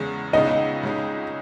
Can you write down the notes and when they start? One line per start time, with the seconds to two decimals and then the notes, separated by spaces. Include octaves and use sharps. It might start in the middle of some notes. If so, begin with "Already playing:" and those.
Already playing: E2 C#3 G#3 B3
0.33 C#2 C#3 G#3 B3 D#4 D#5
0.83 C#2 C#3 G#3 D#4